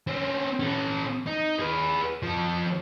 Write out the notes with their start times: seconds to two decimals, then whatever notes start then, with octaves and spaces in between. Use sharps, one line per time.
0.07 C4 C#4
0.60 C#4 A4
1.27 D#4
1.59 G#4 B4
2.23 F3 A4